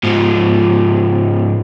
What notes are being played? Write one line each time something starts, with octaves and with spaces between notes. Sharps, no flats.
G#2 F3